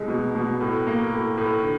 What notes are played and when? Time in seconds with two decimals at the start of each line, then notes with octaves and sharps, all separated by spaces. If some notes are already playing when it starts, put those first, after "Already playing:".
Already playing: C2 G#3
0.08 B2
0.35 B2
0.60 A2
0.87 A#3
1.12 A2
1.38 A2
1.63 D3